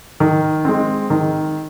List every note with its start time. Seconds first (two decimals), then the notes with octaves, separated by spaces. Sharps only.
0.20 D#3
0.65 G#3 C4
1.10 D#3